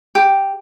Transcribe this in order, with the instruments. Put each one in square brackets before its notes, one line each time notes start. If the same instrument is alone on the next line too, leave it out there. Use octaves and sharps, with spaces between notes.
[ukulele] G4